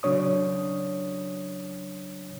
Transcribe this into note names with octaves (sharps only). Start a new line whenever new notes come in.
C#3 F#3 D4 C#5 D#6